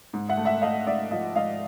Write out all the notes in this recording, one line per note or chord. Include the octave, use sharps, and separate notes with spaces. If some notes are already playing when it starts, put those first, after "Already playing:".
G#2
E5 F#5
A3
E5 F#5
A3 D#5 F5
G#2 D5 E5
F3 D#5 F5
G#2 D#5 F5